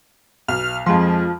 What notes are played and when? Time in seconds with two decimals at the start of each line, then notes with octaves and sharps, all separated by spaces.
0.48 B1 F6
0.86 F2 F3 G#3 C6